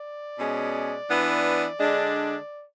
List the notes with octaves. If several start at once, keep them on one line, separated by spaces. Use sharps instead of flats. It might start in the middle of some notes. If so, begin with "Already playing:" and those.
Already playing: D5
B2 G#3 C#4
E3 B3 D4
D3 G#3 D4